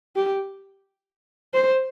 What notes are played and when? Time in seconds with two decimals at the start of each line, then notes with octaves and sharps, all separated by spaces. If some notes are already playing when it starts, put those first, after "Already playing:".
0.16 G4
1.54 C5